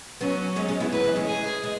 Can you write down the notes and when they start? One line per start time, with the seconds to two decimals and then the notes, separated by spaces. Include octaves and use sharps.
0.21 F#3 B3 C#4
0.56 G#3 C#4
0.68 G#3 C#4
0.80 B3 E4
0.92 F#3 B4
1.04 E3 G#3
1.16 G#3 C#4
1.28 G#4
1.64 G#3